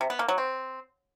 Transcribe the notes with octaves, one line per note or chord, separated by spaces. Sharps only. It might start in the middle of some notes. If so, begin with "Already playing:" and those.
C3
B3
A#3
F#3
C4